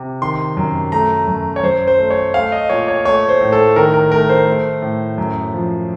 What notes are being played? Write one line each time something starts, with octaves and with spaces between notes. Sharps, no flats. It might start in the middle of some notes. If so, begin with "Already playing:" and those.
Already playing: C3
D#3 C6
F#2
A3 A#5
F#2
C#5
F#2 C5
C5
A3
C#5
A3 F5
D#5
A#2 C#5
C#5
A3 C#5
C5
A2
A4
D#3 A#4
A#4
A3 A#4
C5
A3
A2
F#2
F3